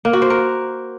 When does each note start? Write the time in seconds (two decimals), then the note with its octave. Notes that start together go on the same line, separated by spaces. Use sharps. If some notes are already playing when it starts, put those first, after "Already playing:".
0.05 A#3
0.13 F#4
0.22 C5
0.30 A#4